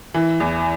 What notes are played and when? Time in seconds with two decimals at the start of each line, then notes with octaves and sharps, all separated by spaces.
0.14 E3
0.40 E2